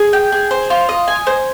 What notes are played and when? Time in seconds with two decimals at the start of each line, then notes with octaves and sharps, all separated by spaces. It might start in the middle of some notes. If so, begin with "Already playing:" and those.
Already playing: G#4
0.13 G5
0.32 G#4
0.51 C5
0.70 F4
0.89 D#5
1.08 G#5
1.27 C5